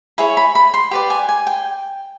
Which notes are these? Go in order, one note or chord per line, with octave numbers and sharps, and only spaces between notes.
E4 G#4 C#5 B5
B5
B5
C6
G4 B4 D5 B5
G#5
G#5
G5